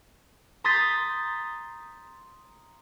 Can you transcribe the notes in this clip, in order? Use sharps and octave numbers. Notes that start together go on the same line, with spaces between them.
A#5 C6 D#6 G6 A6 B6